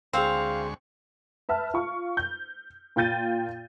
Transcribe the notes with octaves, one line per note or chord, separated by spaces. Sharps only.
D2 G#3 C4 G#4 F5 C6 C#6
B4 E5 A5 F6
F4 C#6
G6
A#2 F4 G5 G6 A6 D#7